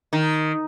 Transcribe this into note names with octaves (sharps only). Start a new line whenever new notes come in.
D#3